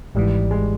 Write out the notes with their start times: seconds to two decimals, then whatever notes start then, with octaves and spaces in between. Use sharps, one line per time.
0.15 G#1 G#2 E3 G3
0.51 G#3